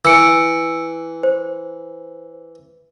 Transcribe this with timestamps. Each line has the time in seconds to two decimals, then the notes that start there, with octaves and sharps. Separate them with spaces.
0.05 E3 E6 C#7 D7
1.23 C5